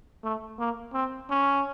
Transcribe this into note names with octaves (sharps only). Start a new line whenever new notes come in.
A3
A#3
C4
C#4